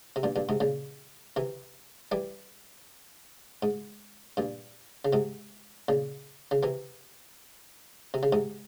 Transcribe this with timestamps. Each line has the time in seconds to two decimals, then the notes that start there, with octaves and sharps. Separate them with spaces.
0.16 C3
0.23 G2 A#2
0.36 G2 A#2
0.49 G#2 C3
0.60 A#2 C#3
1.36 C3 E3
2.12 E3 G3
3.63 G#2
4.37 G2 A#2
5.05 C#3
5.13 G#2 C3
5.89 A#2 C#3
6.51 C#3
6.63 C3 E3
8.14 C3
8.23 C#3
8.33 G#2 C3